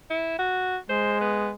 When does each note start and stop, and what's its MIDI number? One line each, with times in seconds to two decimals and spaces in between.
0.10 0.38 64
0.39 0.78 66
0.90 1.55 56
0.90 1.20 72
1.21 1.50 59